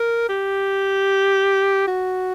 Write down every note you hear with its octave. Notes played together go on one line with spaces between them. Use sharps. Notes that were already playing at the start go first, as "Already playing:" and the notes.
Already playing: A#4
G4
F#4